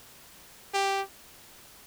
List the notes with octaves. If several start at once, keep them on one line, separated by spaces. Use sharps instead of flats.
G4